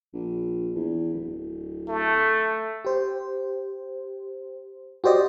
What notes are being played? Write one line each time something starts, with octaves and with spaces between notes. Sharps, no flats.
A#1
E2
D1
A3
G4 C5
F#4 G4 C5 D5 D#5